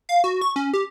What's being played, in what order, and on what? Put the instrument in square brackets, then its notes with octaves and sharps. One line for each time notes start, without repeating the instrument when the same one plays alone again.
[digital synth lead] F5
F#4
C#6
C#4
G4